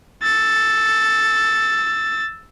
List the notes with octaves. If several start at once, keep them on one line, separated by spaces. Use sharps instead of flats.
E6 A6